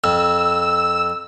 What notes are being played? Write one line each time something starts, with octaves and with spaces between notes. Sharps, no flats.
F2 E6